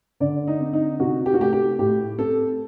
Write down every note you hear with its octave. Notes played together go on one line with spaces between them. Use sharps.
D3 D5
D#4
C4
D#4
C3 F#4
G4
F#4
A3 G4
G4
A2 G4
C4 A4